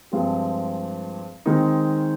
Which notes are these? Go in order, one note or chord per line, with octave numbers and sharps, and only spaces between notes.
G2 F3 G#3 C4 G4
D#3 G#3 C4 D#4 A#4